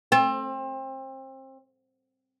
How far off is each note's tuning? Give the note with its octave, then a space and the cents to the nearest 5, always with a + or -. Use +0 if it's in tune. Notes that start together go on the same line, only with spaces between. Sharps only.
C4 +30